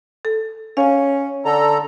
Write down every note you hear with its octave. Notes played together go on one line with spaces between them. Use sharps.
A4
C#4 F5 G#5
D3 A4 A#5